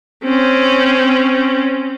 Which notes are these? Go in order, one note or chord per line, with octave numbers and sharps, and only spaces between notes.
C4 C#4